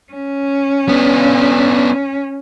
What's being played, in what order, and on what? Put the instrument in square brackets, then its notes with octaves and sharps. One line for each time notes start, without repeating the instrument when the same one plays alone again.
[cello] C#4
[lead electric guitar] B3 D4